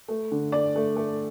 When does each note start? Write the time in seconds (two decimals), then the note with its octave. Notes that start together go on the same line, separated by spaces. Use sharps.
0.08 A3
0.31 D3
0.52 A3 D5
0.76 A3
0.96 A3